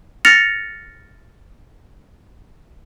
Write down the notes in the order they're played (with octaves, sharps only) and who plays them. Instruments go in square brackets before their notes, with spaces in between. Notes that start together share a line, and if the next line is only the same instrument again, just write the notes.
[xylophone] F6 A6 A#6 C#7 F7